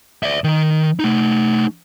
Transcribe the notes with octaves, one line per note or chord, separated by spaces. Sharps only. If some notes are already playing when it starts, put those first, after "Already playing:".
D5 E5
D#3
A3 D#4